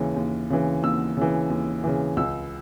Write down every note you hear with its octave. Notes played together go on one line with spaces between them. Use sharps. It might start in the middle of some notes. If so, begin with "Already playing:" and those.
Already playing: D#2 C#3 E3
D#2
C#3 E3
D#2 E6
C#3 E3
D#2
C#3 E3
C#2 E6